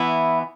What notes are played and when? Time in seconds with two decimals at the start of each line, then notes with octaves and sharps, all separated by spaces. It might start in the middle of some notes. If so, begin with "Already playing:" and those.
Already playing: E3 B3 E4